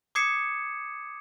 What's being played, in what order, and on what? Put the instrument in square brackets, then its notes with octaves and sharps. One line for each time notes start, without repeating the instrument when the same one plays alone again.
[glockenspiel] D6 D#6 G#6 C7 C#7 E7